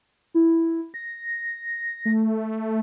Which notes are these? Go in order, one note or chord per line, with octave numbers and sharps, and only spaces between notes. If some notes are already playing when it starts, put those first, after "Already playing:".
E4
A#6
A3